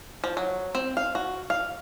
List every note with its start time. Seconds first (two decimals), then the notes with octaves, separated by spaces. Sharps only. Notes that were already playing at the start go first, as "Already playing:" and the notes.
0.24 F3
0.37 F#3
0.75 C4
0.97 F5
1.15 F#4
1.50 F5